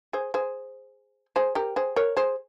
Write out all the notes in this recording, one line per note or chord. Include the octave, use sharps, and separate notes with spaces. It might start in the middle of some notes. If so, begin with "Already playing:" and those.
G#4 C5
G#4 C5
G#4 C5
G4 A#4
G#4 C5
A#4 C#5
G#4 C5